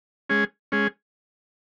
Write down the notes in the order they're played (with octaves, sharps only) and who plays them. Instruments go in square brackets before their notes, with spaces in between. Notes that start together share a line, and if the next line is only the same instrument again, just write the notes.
[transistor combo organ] G#3 C#4 G#4
G#3 C#4 G#4